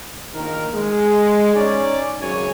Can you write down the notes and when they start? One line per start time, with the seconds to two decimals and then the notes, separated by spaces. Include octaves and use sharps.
0.35 A#1 D#3 A#3 A#4
0.73 G#3
1.55 C#4 D#4 C#5 D5
2.21 G#1 F#2 C#3 C#5 G#5